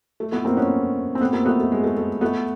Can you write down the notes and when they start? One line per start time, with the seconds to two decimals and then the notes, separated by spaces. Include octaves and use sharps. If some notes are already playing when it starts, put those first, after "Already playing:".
0.20 A3
0.32 A3 B3
0.45 A#3 C4
0.57 B3 C#4
1.15 C4
1.21 A3 B3
1.33 A#3 C4
1.46 A3 B3
1.60 A3
1.72 G#3
1.84 A3
1.97 A3
2.21 A3 B3